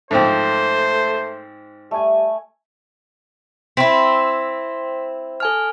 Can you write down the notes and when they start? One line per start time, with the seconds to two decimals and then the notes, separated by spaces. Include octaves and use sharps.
0.11 G#2 F3 A3 C4 C5
1.91 G3 A3 G#5
3.77 C4 E4 C6 B6
5.40 A4 G#5 F6